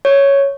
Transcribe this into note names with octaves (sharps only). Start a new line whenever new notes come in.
C#5